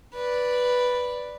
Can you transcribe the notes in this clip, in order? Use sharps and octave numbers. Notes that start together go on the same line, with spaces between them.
B4 D5